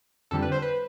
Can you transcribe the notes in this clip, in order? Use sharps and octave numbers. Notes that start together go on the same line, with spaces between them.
F2 D3 G3 A4
B4
C5
B4